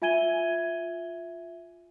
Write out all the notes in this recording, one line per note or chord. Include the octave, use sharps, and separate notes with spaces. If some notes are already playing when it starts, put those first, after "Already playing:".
F4 E5 G#5 G#6 D#7 G7